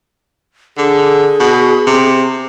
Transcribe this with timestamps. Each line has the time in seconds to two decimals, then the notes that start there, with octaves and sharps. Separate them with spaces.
0.78 D3 G#4
1.40 B2
1.87 C3